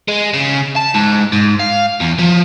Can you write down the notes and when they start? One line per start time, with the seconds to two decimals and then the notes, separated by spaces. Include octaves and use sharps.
0.08 G#3
0.34 C#3
0.77 A5
0.95 G#2
1.32 G#2
1.60 F5
2.01 E2
2.19 F3